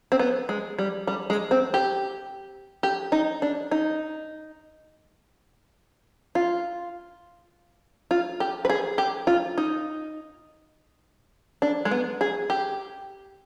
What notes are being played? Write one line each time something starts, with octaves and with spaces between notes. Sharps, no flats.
C4
B3
G#3
G3
G3
G#3
C4
G4
G4
D#4
D4
D#4
F4
F4
G4
B4
G#4
G4
F4
D#4
D4
G#3
B3
G#4
G4